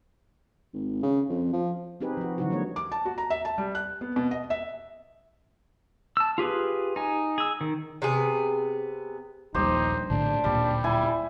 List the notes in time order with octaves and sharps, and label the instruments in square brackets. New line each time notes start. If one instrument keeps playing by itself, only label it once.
[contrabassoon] G#1
C#3
F2
F3
[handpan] C4 D#4 G4 G#4 B4
F3 F#4
D3 E3 F#3 D#4 E4 F#4
G3 G#3 A#3 C#5
[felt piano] D6
A5
F#4
A#5
E5
A5
G3
F#6
B3
B2
D#5
E5
[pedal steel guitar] A5 E6
F4 G4 G#4 B4
D#4 G#5
G#4 E6
D#3
[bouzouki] C3 B3 G#4
[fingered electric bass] D#1 A#1 G3 [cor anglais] D#4 [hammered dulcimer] G4 C5
[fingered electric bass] A#1 A2 D3 [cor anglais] D4
[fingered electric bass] D1 A#2 [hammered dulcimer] G3
[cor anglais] G3 [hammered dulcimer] E4 G#5